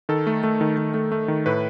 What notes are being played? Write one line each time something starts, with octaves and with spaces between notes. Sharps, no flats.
D#3 A4
A3
A3
D#3
D#3
A3
A3
D#3
A2 B4